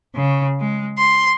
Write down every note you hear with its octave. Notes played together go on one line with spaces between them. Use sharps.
C#3
G#3
C6